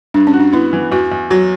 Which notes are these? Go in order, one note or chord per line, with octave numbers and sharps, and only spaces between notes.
G2 D4
C#4
F#4
D4
B3 E4
E3
E2 F#4
E2
F#3 F#4